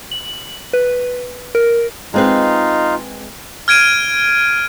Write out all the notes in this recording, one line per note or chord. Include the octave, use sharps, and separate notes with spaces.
F#7
B4
A#4
G#3 C4 D#4 F4 B4
F6 G#6 D7 D#7